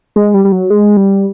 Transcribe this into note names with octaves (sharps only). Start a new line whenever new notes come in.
G#3
G3
G3
F#3
G#3
G3